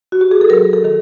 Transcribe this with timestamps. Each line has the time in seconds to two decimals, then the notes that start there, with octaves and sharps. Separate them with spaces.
0.12 F#4
0.21 G4
0.31 G#4
0.41 A4
0.50 F#3 A#4
0.73 A4
0.84 D#3 A4